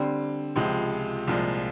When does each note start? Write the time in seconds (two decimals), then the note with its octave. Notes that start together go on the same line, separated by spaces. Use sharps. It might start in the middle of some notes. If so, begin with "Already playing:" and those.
Already playing: D3 G3 C4
0.56 C#2 C3 F3 G#3
1.27 C2 A#2 F3 G#3